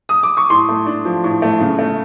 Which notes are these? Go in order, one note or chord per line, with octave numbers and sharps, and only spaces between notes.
D#6
D6
C#6
A2 C6
A3
D4
F3
A2
A3
C#3
A3